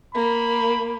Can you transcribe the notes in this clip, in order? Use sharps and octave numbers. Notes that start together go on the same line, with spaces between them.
A#3 B5